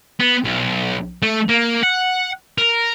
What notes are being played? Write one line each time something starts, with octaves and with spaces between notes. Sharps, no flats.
B3
B1
A3
A#3
F#5
A#4